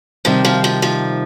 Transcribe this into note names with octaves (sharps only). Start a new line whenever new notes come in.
C3 D#3 F3 G3 D#4
F3
F3
F3